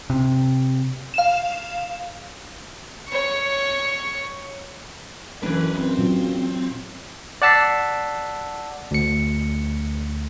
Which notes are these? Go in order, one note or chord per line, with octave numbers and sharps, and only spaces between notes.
C3
F5 E7
C#5 C#6
F#1 E3 D4 A#4 B4
C4
A#2 F#3 F4
D5 F#5 A5 E6 B6 C7
D2 C#7